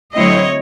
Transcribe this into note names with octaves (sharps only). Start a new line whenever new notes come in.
D3 F#3 A3 C4 E4 C#5 D#5